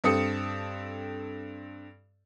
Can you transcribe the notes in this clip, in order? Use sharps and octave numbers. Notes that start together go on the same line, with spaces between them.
G2 C4 A4 D#6 C#7